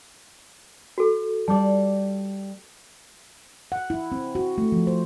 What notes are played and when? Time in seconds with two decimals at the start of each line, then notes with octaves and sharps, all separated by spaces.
0.98 F#4 A4
1.48 G3 D5 A5 D6
3.72 F#5
3.90 E4
4.12 C4
4.35 F#4
4.58 A3
4.72 F3
4.87 C5